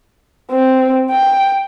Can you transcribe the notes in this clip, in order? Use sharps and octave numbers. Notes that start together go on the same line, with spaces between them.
C4
G5